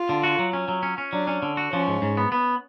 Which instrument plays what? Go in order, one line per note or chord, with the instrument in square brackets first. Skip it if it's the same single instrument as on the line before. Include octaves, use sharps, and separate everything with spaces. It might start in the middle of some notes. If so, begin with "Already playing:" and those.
Already playing: [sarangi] F4
[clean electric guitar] D3
F#4
F#3
C#4
F#3
C#4
C#4
[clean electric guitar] F#3 [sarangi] D4
[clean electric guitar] C#4
D3
F#4
[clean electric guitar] F3 [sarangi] C#4
[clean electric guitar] G#2
G#2
B3
B3